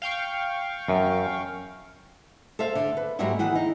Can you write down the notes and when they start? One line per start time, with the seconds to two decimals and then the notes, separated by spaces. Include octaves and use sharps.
0.02 F5 G5 C#6
0.88 F#2
2.59 A4 C5 E5 F5
2.75 D3
2.97 B4
3.19 G#2 F#3 G3 A#3 F#4 E5
3.39 D#3 E3 E4 G#4 F#5
3.55 D#4